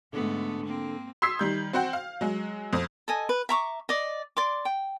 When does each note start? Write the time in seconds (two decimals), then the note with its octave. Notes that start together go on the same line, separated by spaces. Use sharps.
0.13 G#2 D3 A3 B3 D4 A4
0.66 A#3 C4
1.22 C6 D#6 E6 G#6 B6 C7
1.39 D#3 G3 G6
1.73 C4 F#4 C5 F#5 G5
1.93 F5
2.21 F#3 G#3
2.73 F2 C5 D#6
3.08 A4 D#5 G#5
3.29 B4
3.49 E5 A#5 C#6 D6
3.89 D5 D#5
4.37 D5 C6 D6
4.65 G5